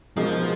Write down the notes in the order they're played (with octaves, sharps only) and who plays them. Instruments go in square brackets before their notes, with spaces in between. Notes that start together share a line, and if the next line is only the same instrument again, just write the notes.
[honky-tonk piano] B2 G#3 D#4 A#4 [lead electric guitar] F3